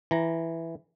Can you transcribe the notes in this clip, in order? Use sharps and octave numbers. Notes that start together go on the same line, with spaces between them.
E3 A#5